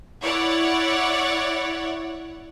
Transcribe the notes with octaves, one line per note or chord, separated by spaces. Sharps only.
E4 C#5 D5 F#5